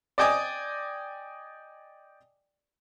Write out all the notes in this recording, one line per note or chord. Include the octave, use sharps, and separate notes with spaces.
D5 D#5 G5 G#5 D6 D#6